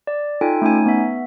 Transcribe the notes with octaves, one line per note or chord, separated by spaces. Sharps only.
D5
D#4 F4 A4 G5 G#5 D7
A3 C#4 D#4 G#5
B3 E5